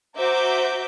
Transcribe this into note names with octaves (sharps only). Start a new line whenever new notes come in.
F#4 C5 E5 A#5 D6 G6